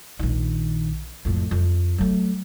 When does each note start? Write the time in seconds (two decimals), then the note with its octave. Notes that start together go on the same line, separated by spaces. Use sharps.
0.19 A#1 D#3
1.25 F2 A2
1.51 F2
1.98 F#3 A3